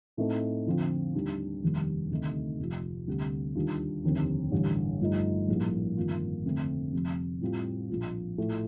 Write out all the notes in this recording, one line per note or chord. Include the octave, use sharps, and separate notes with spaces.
A2 A3 C4 D#4 A4
F2 D3 F3 C4 F4
D#2 D#3 G3 D4
F1 D#2 D#3 G3
D2 C3 D#3 A3 D#4
F1 F2 C3 F3
D2 C3 G3
D#2 D#3 G3 D4 F4
F1 D#2 D3 G3 C4
A1 G2 D3
G1 G2 F3 A3 D#4
A#1 A2 G3 A#3
G1 F2 D#3 A#3 F4
F1 F2 D3 A3 C4
F1 F2 C3
A2 G3 C4 F4
A#1 A#2 F3
A2 F3 A3